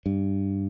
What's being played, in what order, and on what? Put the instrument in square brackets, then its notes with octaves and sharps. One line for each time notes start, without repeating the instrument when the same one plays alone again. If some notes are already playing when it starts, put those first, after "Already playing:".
[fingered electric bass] G2